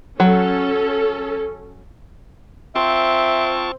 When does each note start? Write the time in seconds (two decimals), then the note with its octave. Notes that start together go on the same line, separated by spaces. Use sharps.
0.20 F#3 C#4 A4
2.76 C4 F4 C5 E5 A5 C#6